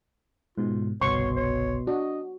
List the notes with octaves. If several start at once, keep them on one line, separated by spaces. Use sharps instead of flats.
G#2 B2 F4
G1 C2 B2 C#5 C6 C#6
C#5
D4 F#4 D#5